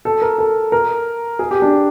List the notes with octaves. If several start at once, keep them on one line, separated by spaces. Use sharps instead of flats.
A4
A#4
A4
A#4
G#4
G4
D4